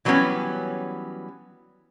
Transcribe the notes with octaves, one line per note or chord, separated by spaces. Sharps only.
E3 F#3 G3 B3 C#4